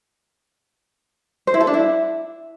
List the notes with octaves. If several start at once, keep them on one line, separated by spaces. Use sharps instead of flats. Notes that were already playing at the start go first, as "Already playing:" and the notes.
C5
E4
A4
D4
E4